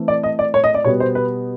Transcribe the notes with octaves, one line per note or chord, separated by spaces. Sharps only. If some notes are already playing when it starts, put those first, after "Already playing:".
Already playing: E3 A3 C4
D5
D#5
D5
C#5
D#5
D5
B2 G3 B3 C#5
C5
B4